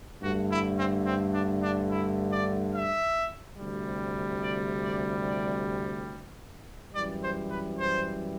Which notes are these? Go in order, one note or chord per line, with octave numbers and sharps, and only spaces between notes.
G2 D3 A3 F#4
E4
C4
C4
D4
D4
E4
D5
E5
D2 C3 G3
D5
D5
D5
F#2 E3 G3 D5
C5
B4
C5